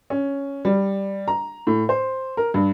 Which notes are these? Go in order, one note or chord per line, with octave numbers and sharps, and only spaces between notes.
C#4
G3
A#5
A2
C5
A#4
G2